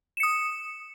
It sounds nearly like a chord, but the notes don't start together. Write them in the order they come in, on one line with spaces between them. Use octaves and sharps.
E7 C#7 D#6